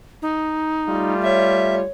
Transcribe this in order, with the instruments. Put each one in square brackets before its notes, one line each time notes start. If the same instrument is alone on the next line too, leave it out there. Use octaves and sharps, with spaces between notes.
[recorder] D#4
[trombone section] G3 A3 F4
[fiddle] C#5 [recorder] E5